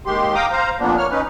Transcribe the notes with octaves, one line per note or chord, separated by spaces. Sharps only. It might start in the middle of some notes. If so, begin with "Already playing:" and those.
D#2 D#3 G#3 G4 C6
F5 G5 A#5 D6 D#6
C5 F5 A#5
F2 A#2 A#3 B3 D4
A#3 C#5 F6
C#4 D#4 B4